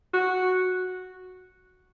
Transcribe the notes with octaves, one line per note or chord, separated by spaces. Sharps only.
F#4